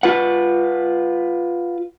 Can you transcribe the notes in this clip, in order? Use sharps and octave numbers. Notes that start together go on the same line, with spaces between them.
F4 B4 F#5